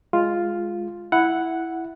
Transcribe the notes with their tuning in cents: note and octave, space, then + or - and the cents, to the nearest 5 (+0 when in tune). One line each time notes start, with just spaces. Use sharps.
G#3 +0 F4 +0
E4 +0 F#5 +0